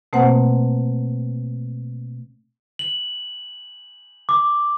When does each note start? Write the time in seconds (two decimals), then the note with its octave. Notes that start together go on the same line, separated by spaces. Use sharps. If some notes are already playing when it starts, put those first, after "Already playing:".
0.13 B2 A3 A#3 C4 C5 F#5
2.79 F#7
4.29 D6